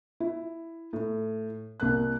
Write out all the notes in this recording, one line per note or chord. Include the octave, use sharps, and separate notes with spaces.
E4
A2
C2 A#3 F#6